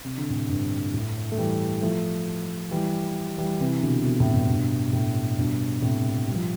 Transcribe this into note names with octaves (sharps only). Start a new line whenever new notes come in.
C3
D3
A2 C3
G2
A2
A3
E3 G3
F3 A3
E3 G3
E3 G3
C3 E3
B2 D3
B2 D3
A2 C3
G2 B2
G2 B2
A2
G2 B2
A2 C3
G3
F3